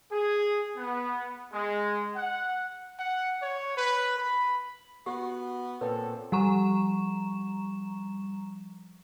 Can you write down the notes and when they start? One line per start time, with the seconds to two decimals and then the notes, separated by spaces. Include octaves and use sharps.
0.12 G#4
0.77 B3
1.53 G#3
2.15 F#5
2.99 F#5
3.42 C#5
3.77 B4
4.18 B5
5.06 B3 F#4 G4
5.81 A#2 C4 A4 B4 C#5
6.32 F3 G3 A#5 C#6 E7